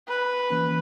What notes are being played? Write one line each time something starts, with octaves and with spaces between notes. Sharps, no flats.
B4
E3 A#3 C#4